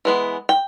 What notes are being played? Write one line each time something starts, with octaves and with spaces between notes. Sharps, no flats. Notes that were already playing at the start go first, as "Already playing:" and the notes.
E3 G#3 B3
G5